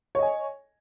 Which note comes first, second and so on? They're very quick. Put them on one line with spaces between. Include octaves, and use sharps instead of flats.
C#5 D#5 G#5